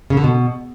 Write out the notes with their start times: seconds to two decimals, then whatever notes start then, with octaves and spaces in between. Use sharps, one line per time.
0.10 C#3
0.17 D3
0.24 B2